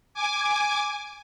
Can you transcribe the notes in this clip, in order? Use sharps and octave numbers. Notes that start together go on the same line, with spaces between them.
G#5 D6